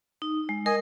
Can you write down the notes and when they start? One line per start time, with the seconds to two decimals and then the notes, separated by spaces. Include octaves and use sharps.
0.22 D#4
0.49 G#3
0.66 A#4 D#5 G#5